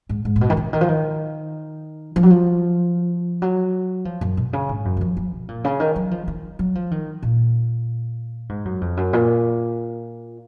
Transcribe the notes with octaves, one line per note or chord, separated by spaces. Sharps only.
G#2
G#2
A#2
B2
D#3
C#3
D#3
F3
D#3
F3
F#3
F3
F#3
F3
F#2
B2
C#3
G#2
F#2
F#3
F3
F#3
B2
A#2
C#3
D#3
F#3
F3
D#3
F#3
F3
D#3
A#2
G#2
F#2
F2
F#2
A#2